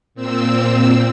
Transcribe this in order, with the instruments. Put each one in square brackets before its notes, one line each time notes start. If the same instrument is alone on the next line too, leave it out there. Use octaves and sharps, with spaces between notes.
[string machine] A#2 C4 E6